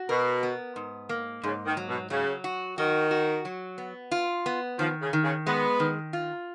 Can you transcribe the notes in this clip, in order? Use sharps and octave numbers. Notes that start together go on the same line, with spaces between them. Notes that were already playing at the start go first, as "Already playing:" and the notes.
Already playing: F#4
B2 A#4
B3
G#2
A#3
G#2 C#3
D#3
F#3
B2
C#3 F#3
F#4
D#3 F#4
F#4
F#3
B3
F4
B3
D#3 F3
C#3
D#3
C#3
G#3 B3
D#3
F4